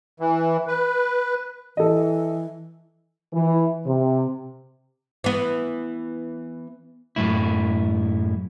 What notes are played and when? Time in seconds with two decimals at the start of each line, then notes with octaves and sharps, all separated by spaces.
0.20 E3
0.67 B4
1.77 E3 A4 D#5
3.33 E3
3.86 C3
5.24 E3 B3
7.16 F#2 A2 E4